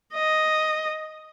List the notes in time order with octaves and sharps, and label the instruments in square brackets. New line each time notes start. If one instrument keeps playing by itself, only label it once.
[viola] D#5